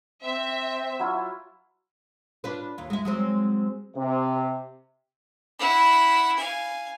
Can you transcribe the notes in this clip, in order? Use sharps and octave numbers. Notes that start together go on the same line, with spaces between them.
C4 E5
F#3 E4 F4
D4 F4 B4
D#2 F4
G#3 E5
F#3 G#3 C4
C3
E4 F#5
F5 G#5